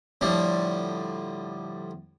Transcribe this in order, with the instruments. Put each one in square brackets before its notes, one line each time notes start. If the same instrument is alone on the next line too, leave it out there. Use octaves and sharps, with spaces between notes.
[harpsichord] A2 D3 F3 G3